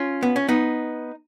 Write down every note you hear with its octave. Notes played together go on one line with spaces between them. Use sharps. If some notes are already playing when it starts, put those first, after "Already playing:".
Already playing: C#4 F4
B3
C#4
B3 D#4